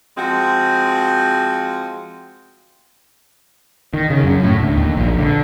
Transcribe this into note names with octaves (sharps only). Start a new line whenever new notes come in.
F3 G#3 C4 F#4
D#3
C#3
F#2
A2
D2
D#2
A#1
D3